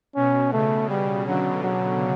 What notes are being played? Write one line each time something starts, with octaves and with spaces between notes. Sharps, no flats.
B2 C#4
C#3 A3
C#3 G3
D3 F#3
F#3